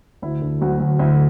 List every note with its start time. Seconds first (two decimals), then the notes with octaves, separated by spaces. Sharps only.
0.22 D2 E4
0.41 D3
0.61 D2 F#3 F#4
0.80 D2
0.99 D2 E4